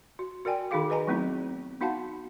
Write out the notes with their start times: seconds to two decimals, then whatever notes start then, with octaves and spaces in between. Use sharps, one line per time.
0.19 F#4
0.45 F#4 A#4 D5 G5 G#5
0.71 D#3 D#4 F#4 G#4 F5 D6
0.90 B4 D#5 G#5 A#5
1.07 F#3 A3 B3 C4 D#4 E4
1.81 B3 D#4 F#4 F5 F#5 A5